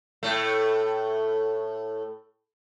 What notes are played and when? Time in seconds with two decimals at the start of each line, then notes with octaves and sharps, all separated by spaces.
0.23 A2 A3